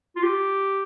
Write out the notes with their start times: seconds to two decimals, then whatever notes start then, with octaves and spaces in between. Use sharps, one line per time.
0.16 F4
0.23 G4